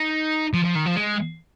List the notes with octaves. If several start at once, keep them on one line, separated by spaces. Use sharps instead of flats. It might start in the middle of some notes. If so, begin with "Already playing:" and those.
Already playing: D#4
F3
F3
D#3
F3
G#3